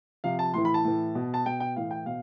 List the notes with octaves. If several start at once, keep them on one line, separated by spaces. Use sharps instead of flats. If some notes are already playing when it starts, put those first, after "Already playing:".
C3 F3 F5
A5
A2 E3 C6
B5
A5
A2 E3
B2
A5
B2 G5
G5
A2 E3 F5
G5
B2 F5